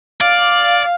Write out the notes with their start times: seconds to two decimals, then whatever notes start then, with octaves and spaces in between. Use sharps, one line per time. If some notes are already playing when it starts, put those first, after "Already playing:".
0.21 D5 F5